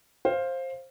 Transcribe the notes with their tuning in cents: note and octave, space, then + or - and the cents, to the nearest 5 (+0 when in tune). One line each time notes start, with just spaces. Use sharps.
C5 +15 F5 +0